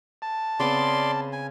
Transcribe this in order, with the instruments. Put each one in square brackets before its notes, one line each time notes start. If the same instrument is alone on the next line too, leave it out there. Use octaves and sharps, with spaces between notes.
[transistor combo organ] A5
[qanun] C#3 B3 C4 [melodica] D5 C6
[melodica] G#5